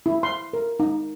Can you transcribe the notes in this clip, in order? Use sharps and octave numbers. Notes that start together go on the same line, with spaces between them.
E4
C6
A#4
D#4